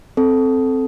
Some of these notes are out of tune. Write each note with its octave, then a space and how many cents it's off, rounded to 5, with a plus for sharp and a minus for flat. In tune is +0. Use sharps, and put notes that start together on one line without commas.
C4 +0 A4 -10